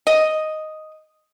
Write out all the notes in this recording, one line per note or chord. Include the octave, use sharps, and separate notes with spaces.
D#5